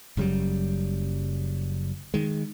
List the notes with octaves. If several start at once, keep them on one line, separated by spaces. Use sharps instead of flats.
F#1 C#3 F#3 G3
D#3 G#3